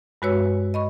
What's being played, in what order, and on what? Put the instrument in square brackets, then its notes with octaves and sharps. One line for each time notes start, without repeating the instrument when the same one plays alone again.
[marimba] G2 G#3 F#4 B4 C#5 E6
D#5 B5 C#6